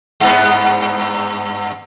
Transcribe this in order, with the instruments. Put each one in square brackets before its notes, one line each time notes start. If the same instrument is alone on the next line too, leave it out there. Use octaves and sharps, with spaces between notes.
[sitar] G2 B3